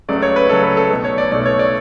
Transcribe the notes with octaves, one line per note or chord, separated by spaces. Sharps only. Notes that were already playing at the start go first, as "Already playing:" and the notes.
C#2 C#3 F#3 A3 D5
C#5
B4
C#2 C#3 F#3 A3 A4
B4
A4
B1 B2 A3
C#5
D5
B1 B2 A3 D5
C#5
D5